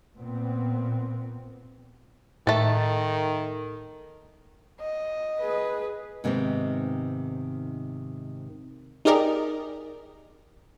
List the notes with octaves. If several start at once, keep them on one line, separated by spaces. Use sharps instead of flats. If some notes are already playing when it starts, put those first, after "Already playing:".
A#2 B3 C4
A2 D#3 A3 A4
D#5
G#4 B4
G#2 C3 D#3 B3 C4
D#4 G4 G#4 A#4 D5 D#5